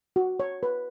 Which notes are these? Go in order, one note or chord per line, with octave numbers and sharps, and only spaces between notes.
F#4
C#5
B4